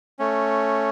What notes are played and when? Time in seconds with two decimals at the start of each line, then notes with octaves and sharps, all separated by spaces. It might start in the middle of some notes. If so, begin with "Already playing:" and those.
0.19 A3 C#4